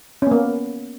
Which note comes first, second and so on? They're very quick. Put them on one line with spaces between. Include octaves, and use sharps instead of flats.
C#4 B3 A#3